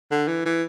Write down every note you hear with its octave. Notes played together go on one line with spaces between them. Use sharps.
D3
E3
E3